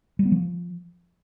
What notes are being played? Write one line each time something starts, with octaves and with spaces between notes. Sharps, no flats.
G3
B3
F3